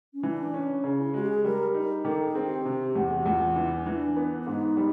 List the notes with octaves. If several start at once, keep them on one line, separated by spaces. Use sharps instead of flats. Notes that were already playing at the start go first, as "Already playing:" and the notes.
C#4
E3 D4
C#4
C#3
E4
G#3 F#4
G4
G#4
G3 A#4
D#4
D#3 A4
G#4
C4
G4
C3
E2
G#4
G4
F#4
E2 F4
E3
E3 D4
B3
D4
G#2 D#4
G3